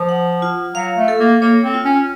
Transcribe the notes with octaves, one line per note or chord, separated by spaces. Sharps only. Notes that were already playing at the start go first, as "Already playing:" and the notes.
Already playing: F3 C5
F#5
F4
F#3 F5
A3
A4
A#3
A#3 C#5
C4
F4
C#4